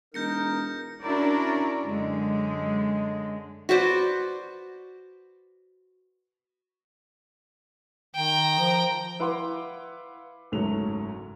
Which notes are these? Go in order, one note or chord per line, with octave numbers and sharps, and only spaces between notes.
E1 D#4 A#4 G6 A#6 C#7
C#4 D4 E4 F#4 A#4 D5
F#2 D3 G#3
F#4 B4 C5 D5
D#3 G5 A#5
F3
E4 B4 F5 F#5 C6 D6
F#1 G#2 F#3 A3 C#5 F7